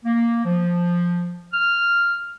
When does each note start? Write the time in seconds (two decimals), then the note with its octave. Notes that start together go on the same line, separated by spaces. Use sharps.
0.05 A#3
0.44 F3
1.53 F6